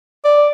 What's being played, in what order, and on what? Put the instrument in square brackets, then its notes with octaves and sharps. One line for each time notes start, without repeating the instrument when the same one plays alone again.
[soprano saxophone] D5